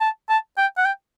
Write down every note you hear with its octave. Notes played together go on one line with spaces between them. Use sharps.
A5
A5
G5
F#5
G5